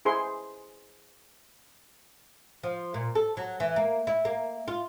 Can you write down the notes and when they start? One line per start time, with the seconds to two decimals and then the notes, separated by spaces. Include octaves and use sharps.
0.05 E4 G#4 C5 C6
2.63 F3
2.94 A#2
3.15 A4
3.37 F#3
3.60 E3
3.76 A#3
4.07 E4
4.25 A#3
4.68 F4